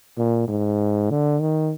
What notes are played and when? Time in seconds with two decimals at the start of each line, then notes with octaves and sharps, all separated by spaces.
0.18 A#2
0.48 G#2
1.10 D3
1.41 D#3